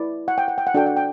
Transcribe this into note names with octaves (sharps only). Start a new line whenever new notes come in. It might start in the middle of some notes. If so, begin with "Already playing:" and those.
Already playing: E4 B4 D5
F#5
G5
F#5
G5
F#5
D4 F#4 A4 G5
F#5
G5